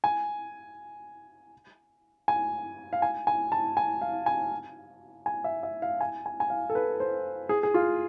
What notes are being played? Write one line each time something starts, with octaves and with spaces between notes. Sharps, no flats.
G#5
G#5
F5
G#5
G#5
A5
G#5
F5
G#5
G#5
E5
E5
F5
G#5
G#5
G#5
F5
A4
B4
C5
G#4
G#4
F4